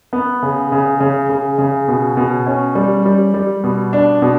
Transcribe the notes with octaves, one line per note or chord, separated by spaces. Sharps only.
B3
C#3
C#3
C#3
C#3
C#3
B2
B2
C#4
G3
G3
G3
B2
D4
B2